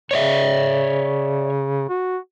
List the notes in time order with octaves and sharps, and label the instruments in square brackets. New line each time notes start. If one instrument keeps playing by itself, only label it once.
[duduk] C#3 [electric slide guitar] C#5 D5 E5
[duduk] F#4